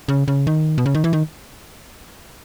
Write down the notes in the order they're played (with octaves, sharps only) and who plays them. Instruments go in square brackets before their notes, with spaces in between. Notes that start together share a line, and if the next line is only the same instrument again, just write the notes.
[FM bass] C#3
C#3
D#3
B2
C#3
D#3
E3
D#3